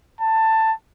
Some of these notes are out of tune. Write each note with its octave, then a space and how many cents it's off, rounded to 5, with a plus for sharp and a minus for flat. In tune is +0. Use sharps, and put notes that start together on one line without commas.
A5 +15